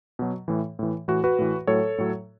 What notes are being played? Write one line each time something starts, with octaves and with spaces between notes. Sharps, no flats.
B2 F#3
A2 E3
A2 E3
A2 E3 F#4
F#4 B4
A2 E3
A2 F#3 A4 C#5
A2 F#3